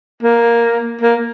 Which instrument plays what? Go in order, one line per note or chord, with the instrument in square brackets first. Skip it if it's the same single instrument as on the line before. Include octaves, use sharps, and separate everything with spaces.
[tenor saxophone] A#3
A#3